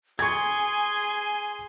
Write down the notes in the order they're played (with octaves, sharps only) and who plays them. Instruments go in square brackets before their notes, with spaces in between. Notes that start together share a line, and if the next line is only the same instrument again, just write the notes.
[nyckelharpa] G#4 C6 [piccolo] G#5 [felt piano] C#6 G#6